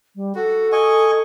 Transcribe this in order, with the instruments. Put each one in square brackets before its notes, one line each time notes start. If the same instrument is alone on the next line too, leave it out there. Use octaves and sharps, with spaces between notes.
[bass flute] G3
[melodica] F#4 [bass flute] A4
[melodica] D#5 G#5 C#6